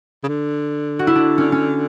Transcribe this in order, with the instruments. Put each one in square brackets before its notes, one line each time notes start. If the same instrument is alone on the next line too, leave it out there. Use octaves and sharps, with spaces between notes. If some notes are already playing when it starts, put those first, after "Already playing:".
[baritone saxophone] C#3
D3
[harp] F#4
E4
D4
C#4
C#4